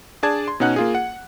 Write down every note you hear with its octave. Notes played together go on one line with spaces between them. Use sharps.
D4 G#4 D5 A5 G#6
C6
B2 C#4 D#4 F#5 F#6
A#3 F4 G#4
F#5